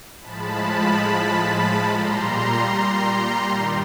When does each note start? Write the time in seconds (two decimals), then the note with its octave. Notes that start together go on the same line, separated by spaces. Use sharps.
0.21 A2 F3 G#3 A5 B5
1.85 A#2 G3 A#5 C6
3.50 G2 D#3 G3